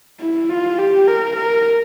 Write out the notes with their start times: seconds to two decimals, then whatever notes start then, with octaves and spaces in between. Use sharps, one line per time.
0.20 E4
0.49 F4
0.78 G4
1.07 A#4
1.37 A#4